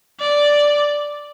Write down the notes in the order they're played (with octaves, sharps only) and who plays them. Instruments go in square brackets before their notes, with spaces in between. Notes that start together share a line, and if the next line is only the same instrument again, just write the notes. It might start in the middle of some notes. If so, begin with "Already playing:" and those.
[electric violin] D5